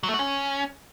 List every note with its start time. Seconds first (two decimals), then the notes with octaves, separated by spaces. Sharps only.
0.03 F#3
0.09 A3
0.14 F#4
0.19 C#4